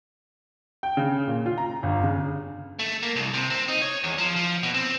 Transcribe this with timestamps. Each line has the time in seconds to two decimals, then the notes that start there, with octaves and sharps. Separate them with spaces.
0.83 G5
0.97 C#3
1.27 A#2
1.46 F4
1.58 A#5
1.83 G1
2.03 C#3
2.79 A3
3.03 A#3
3.16 C2
3.34 C3
3.50 C4
3.68 D#4
3.82 C#5
4.04 E2
4.18 F3
4.36 F3
4.63 B2
4.74 C4